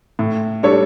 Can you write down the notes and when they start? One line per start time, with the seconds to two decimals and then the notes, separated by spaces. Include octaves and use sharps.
0.19 A2
0.63 G3 D4 A4 C#5